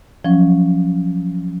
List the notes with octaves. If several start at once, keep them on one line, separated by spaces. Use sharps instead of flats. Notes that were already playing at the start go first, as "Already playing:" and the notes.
F3 F#3 C#4